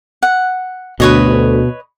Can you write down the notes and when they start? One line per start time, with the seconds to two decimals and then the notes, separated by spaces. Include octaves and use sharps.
0.23 F#5
1.00 D2 B2 B4 C#5 D#5